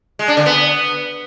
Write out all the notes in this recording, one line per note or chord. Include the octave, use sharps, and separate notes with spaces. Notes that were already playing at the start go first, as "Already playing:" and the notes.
G#3
D4
D3
B3